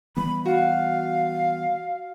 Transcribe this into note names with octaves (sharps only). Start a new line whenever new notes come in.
E3 G3 B3 B5
F#4 F5